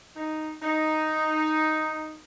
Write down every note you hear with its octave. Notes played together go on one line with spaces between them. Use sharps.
D#4
D#4